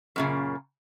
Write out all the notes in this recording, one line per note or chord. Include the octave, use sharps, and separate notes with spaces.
F#2 A#2 C#3